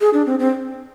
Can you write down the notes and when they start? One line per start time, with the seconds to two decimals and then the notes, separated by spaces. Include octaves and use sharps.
0.01 G#4
0.13 D4
0.26 C4
0.39 C4